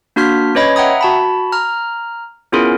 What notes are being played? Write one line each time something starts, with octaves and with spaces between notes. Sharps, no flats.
A#3 D4 F#4 C6 F6 B6
C#4 B4 C#5 D#5 B5 G#6
E5 F#5 G5 A#5 D#6
F#4 A5 B5
A#5 F6
B3 C#4 E4 F4 G#4 A#4